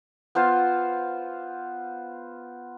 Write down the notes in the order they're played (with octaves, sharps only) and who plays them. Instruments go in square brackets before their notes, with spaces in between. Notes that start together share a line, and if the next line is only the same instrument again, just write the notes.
[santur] B3 F4 C5 F5